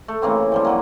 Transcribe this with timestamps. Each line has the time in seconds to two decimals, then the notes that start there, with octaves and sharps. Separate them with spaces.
0.08 A3
0.22 C#3 E3 A#3 C4
0.52 C3 F3 G3
0.65 D3 F#3 A#3